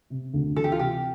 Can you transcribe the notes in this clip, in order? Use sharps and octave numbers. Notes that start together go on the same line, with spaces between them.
C3
D2
E3 A4
G4
F4
C3 G4